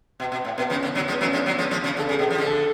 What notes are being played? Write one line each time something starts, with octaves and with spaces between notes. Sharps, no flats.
B2
B2
A2
B2 B3
C#3 F3
C#4
D3
D3 F#3
F3 G#3
B3
F#3 A3 C#4
F3 G#3 D4
D3 F#3
F3 G#3
F3 G#3
C#3 F3
D3 A4
C#3 G#4
B2
F3
D3
A4